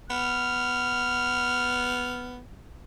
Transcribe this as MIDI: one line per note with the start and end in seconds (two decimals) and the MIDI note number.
0.10 2.39 59
0.10 2.37 89